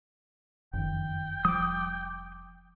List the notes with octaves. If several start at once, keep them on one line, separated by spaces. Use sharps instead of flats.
F#1 F2 D#3 G5
F1 F3 G3 D6 D#6